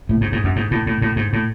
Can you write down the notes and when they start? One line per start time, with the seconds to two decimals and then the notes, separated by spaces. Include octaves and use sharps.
0.09 A2
0.21 G#2
0.32 G#2
0.44 F#2
0.56 G#2
0.71 A2
0.87 A2
1.02 A2
1.16 G#2
1.33 A2